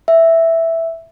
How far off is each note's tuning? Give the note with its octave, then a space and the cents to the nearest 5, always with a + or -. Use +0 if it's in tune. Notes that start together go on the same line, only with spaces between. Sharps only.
E5 +0